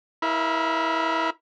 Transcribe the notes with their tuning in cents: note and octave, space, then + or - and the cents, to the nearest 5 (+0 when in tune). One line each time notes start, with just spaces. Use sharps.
E4 -20 A#4 +25 F5 -35